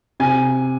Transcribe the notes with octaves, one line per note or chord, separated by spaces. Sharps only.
C3 G#5